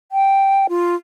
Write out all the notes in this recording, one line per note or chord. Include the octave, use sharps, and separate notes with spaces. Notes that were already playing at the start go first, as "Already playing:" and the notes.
G5
F4